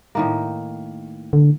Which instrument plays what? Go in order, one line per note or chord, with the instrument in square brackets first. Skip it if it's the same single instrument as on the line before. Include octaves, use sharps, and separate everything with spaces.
[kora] A2 D#3 A#3
[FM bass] D3